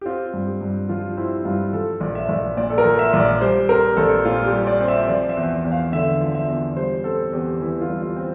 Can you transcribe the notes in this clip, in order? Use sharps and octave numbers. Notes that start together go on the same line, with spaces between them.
G4
C4 F4
G2
G4
G2
F3 F4
C4 E4
G2 F4
F3 A4
A#1
E5
A#1
A#2 D5
A4
A#4
F3
E5
A#1
D5
G3 C5
C4 A#4
A#1 A4
A#2 F4
G4
G3
D5
C4
E5
F3 D5
E5
E2
E2
F5
D3 E5
F3
E5
E2
G3 C5
C4 A4
E2 G4
E3 E4
F4
G3
F4
C4